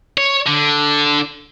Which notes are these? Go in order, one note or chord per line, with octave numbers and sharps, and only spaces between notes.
C#5
D3